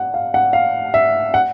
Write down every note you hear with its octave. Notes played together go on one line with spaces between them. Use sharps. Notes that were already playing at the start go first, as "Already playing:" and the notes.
Already playing: F#5
F5
F#5
F5
E5
F#5